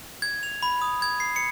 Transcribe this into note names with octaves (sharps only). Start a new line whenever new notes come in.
G#6
F7
B5
D#6
G#6
C7
C#7